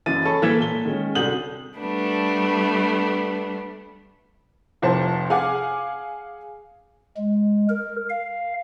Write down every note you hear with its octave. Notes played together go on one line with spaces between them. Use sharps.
F#1 F#2 E3 A6 D#7
G#4 A4 C#5 A5 B5 C#6
E3 A#3 A4 G#6 B6 E7
A#2 A4 G7
D#3 G#3 C#4
C2 D3 F#4 D#6 G6 F#7
G3 A3 B3 D4
F1 C2 F3 C5 A5
G#4 F5 F#5 G#5 D6
G#3
A#4
F5